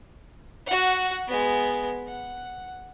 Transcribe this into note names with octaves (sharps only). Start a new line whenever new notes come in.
F#4 F#5
G#3 B3
F#5